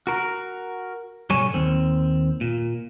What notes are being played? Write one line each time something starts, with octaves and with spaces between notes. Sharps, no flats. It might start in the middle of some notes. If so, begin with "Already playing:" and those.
F#4 A#4
B1 G2 D3 F#3 C#5 G#5
D#2 C4
A#2